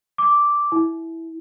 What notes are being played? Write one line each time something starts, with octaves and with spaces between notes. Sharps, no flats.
D6
E4